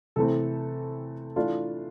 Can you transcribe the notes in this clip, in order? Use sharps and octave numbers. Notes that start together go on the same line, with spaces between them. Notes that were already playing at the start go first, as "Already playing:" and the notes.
C3 E3 A3 C4 A4
E3 A3 D4 F4